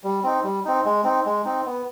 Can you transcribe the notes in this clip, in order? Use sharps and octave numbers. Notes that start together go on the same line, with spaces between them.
G3
C4 D#4
G3
C4 D#4
G#3
C4 D#4
G#3
C4 D#4
B3